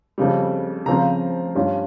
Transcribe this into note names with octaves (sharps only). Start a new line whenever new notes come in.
F2 C#3 G3
C#3 F3 C4 A#5
G2 G3 C#4 F4